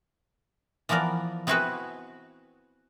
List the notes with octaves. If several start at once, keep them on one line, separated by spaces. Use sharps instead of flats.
E3 F3 B3 A#4 D5
B3 C4 E4 F#4 G#4 B4